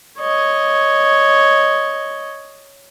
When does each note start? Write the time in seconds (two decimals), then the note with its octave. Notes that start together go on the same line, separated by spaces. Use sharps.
0.19 C#5 D#5